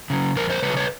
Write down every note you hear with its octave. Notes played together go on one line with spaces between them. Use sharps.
C#3 F#3
F2 A#4 C5
A#4 C5
C#3 F#3 B4 C#5
B4 C#5